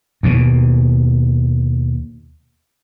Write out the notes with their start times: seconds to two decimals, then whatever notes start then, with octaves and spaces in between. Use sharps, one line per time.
0.23 D#2 B2